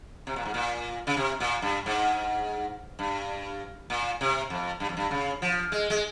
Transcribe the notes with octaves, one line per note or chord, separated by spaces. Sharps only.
C3
A#2
G#2
A#2
C#3
C3
A#2
G2
G#2
G2
A#2
C3
F2
G2
F2
G2
C#3
F3
G#3
G#3